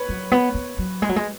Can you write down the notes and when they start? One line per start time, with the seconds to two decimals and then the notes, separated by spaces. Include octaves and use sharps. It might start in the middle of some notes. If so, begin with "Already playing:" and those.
Already playing: B4 C#5
0.09 F#3
0.31 B3
0.54 B3
0.78 F#3
1.02 G#3
1.09 F#3
1.16 G#3